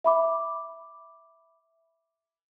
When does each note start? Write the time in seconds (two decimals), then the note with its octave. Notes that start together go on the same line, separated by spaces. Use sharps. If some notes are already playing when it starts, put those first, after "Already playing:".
0.04 E5 B5 D6